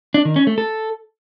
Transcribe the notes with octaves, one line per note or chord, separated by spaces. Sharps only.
D4
D#3
C#4
A3
A4